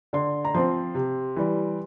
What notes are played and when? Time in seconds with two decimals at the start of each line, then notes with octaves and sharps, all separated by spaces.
0.13 D3 C6
0.45 A#5
0.54 F3 C4 C6
0.95 C3
1.36 E3 G3